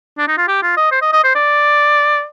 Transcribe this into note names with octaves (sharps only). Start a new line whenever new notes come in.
D4
D#4
F4
G4
F4
D#5
C5
D#5
D#5
C5
D5